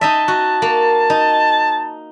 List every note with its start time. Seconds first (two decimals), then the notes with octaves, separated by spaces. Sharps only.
0.01 D#4 D#5 E5 A5
0.28 F#4
0.62 A#3
1.10 D#4